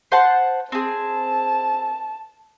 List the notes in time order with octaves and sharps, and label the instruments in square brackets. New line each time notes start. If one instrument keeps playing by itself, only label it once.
[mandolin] C5 F#5 A5
[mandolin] C4 G#4 [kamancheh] A5